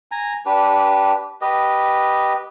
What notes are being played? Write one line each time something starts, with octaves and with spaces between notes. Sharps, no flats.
G#5 A#5
D4 G4 B4
G4 B4 D#5